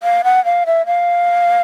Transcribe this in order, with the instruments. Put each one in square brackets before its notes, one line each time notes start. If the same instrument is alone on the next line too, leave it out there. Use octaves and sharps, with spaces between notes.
[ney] F5
F#5
F5
E5
F5